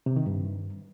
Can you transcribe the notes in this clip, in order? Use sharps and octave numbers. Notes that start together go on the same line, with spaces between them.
C3
D#3
G2